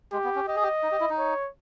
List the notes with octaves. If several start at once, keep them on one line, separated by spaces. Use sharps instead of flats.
G#3 G4
B3
C#4
G4 D#5
G#4
G4
D#4
G4
E4
D#4
C#5